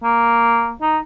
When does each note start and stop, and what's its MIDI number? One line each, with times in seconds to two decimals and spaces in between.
0.03 0.73 58
0.82 0.98 63